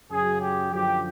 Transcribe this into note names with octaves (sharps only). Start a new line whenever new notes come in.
F#2 C#3 F#3 G#4
G4
F#2 D3 F3 G4